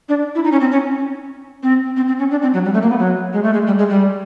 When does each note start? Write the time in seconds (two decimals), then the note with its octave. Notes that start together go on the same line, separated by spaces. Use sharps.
0.09 D4
0.35 E4
0.44 D#4
0.52 C#4
0.60 C4
0.72 C#4
1.63 C4
1.97 C4
2.08 C4
2.19 C#4
2.31 D4
2.42 C4
2.54 F#3
2.65 G3
2.74 A3
2.82 A#3
2.90 B3
2.99 F#3
3.33 G#3
3.43 A3
3.53 G#3
3.67 G3
3.78 G#3
3.90 G3